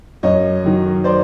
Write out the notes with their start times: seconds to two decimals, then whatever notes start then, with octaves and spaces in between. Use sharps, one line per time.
0.23 F#2 C#5 D#5
0.64 D#3 F#3
1.04 C5 D5